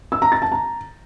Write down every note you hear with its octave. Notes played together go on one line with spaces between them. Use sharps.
E6
A#5
A6
A5
A#5